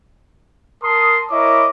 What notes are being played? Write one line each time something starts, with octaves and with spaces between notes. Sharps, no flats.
A#4 A5 C6 D#6
E4 A#4 C#5 D#5 B5 D6